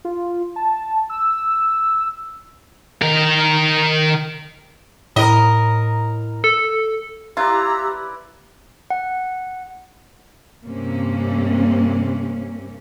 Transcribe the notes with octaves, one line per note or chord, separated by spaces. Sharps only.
F4
A5
E6
D#3 A#4
A2 A#4 D#5
A4
E4 F4 G4 B4 D5 A#5 E6
F#5
G2 C3 A#3 C#4